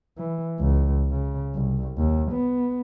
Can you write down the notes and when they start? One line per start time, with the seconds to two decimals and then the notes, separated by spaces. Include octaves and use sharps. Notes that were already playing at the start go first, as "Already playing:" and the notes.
0.18 E3
0.60 C#2
1.11 C#3
1.55 C2
1.98 D#2
2.32 B3